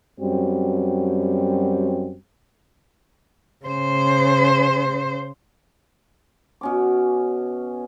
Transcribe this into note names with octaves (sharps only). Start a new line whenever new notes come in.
F#2 G3 C4 F#4
C#3 C5
B2 C#4 D6